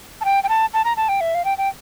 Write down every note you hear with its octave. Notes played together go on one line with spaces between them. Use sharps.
A5
G5
G5
A5
A5
A#5
A5
G5
E5
F5
G5
G5